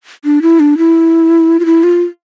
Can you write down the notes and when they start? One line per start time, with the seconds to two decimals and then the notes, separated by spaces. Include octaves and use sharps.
0.25 D4
0.42 E4
0.60 D4
0.78 E4
1.60 F4
1.66 E4
1.84 F4